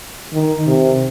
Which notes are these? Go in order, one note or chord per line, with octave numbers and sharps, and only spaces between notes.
D#3
C3